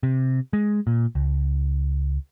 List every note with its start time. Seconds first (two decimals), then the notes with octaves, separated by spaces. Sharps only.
0.03 C3
0.53 G#3
0.87 A#2
1.15 C#2